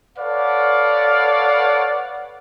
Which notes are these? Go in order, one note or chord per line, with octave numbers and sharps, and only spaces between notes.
A4 B4 C#5 D5 F5 F#5